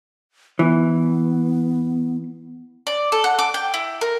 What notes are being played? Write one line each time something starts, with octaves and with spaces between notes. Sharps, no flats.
E3 B3
D5
A4
F#5
D6
G5
E4
A#4